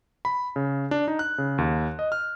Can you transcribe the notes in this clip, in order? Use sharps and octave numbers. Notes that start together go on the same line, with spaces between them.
B5
C#3
D4
D#4
F#6
C#3
D#2
D#5
F6